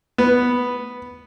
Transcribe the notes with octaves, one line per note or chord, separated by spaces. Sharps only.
B3